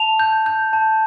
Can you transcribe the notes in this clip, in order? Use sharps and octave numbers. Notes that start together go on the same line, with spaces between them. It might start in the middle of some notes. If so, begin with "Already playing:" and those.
Already playing: A5 F7
G6
G6
A5